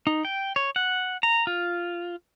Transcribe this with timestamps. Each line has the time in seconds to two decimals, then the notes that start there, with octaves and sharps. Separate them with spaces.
0.07 D#4
0.25 G5
0.56 C#5
0.76 F#5
1.23 A#5
1.47 F4